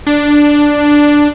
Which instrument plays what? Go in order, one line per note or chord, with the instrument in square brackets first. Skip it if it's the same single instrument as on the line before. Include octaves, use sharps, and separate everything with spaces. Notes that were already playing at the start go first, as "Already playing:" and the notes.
[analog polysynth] D4